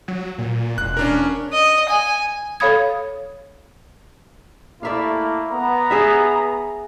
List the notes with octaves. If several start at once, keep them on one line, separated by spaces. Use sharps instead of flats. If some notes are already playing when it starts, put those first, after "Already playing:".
F#3
A#2
E1 F#6
C#4 D4 A#4
D#5
G#5
A4 C#5 F5 B5 D#6 G#6
A3 A#3 E4 D5 E5 F5
B3 A#5
G#4 E5